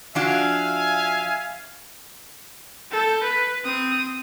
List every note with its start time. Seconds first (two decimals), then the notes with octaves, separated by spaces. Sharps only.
0.15 F3 D4 F#4 E5 F5 G#5
2.92 A4 G6
3.23 B4
3.65 C4 D#6